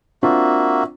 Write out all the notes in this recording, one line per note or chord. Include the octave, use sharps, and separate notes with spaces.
A#3 C4 D4 F4 F#4 E5